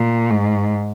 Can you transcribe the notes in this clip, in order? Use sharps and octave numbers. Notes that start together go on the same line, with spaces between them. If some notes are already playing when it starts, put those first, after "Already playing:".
Already playing: A#2
G#2